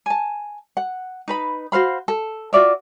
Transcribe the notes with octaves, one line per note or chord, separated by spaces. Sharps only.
G#5 A5
F#5
D#4 B4 B5
F#4 C5 F5 B5
A4
F4 F#4 D5 E5